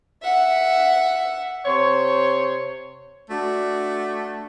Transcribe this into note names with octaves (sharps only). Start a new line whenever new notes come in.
E5 F#5
C3 C5 C#5
A3 D4 F#4